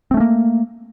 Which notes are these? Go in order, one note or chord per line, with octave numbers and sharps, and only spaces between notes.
A3 A#3 C4 C#4